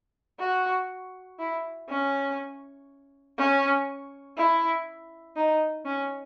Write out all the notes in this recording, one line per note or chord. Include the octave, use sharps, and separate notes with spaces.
F#4
E4
C#4
C#4
E4
D#4
C#4